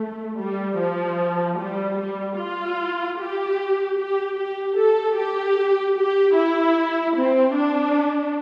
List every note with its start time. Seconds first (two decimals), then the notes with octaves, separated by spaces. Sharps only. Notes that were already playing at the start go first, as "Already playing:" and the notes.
Already playing: A3
0.39 G3
0.79 F3
1.59 G3
1.99 G3
2.38 F4
3.19 G4
3.98 G4
4.38 G4
4.78 A4
5.17 G4
5.97 G4
6.36 E4
7.17 C4
7.56 D4